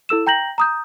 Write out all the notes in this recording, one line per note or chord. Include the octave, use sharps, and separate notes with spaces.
E4 A4 E6 E7
G5 A#5 G6 A#6 F#7
A#5 D#6 G6